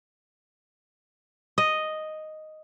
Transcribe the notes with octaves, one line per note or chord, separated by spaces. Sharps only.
D#5